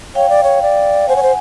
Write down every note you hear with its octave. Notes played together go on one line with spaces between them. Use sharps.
C#5 F5 G5
D5
C#5
D5
C5 F#5 G#5
C#5
C5